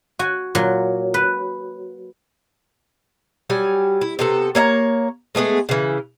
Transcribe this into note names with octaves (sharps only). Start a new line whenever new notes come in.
F#4 G#5
A#2 F#3
B4
F#3 G3 G#5
E4
C3 B3 A4
A#3 C#5 E5 A#5
G#3 A3 B3 G#4
C#3 E3